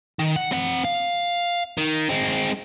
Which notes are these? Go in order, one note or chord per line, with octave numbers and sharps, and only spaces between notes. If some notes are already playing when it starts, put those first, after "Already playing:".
D#3
F#5
C4 F#5
F5
D#3
G#3 C4